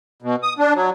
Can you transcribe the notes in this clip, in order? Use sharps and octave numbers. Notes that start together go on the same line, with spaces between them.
B2
D#6
D4
F#3